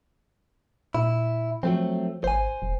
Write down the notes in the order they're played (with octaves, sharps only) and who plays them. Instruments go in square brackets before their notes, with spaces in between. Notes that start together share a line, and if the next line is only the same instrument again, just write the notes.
[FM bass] A#2 [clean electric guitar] E4
[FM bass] F3 [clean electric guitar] F#3 A3 C4
[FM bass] G#1 [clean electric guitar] C5 G#5
[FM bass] E1